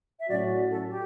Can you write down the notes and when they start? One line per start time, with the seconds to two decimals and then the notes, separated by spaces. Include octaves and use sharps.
0.20 E5
0.29 A2 F#3 C#4 F#4 D5
0.70 A4
0.89 G4